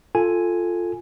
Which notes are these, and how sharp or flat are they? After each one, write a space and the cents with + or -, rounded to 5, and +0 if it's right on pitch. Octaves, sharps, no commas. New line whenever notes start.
F4 +0 A4 +0 G#5 +0